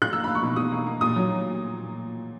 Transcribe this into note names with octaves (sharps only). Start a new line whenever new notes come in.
F#6
A#3 E6
A#3 B5
C#6
B2
B2 D#6
A#3
A#3
A#2 D#6
F#3